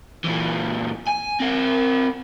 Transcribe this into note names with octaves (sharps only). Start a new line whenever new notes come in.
A#2 E3
G#5
C4 A#4